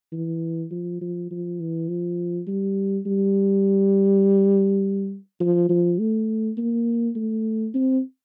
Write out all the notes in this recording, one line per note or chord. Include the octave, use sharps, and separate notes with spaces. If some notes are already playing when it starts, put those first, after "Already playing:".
E3
F3
F3
F3
E3
F3
G3
G3
F3
F3
A3
A#3
A3
C4